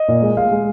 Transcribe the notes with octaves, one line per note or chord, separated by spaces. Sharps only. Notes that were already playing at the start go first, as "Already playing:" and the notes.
Already playing: D#5
A#2
G#3
G#3 F5
G#3